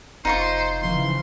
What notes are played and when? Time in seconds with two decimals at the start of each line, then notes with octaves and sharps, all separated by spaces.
0.25 F1 D#4 F4 C5 C#6
0.82 C#3 E3 F3 C6